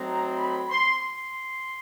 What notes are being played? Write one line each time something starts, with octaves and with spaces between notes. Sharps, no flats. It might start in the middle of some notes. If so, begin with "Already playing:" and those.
Already playing: F#3 A3 C4 D#4 A#5
B5
C6
C6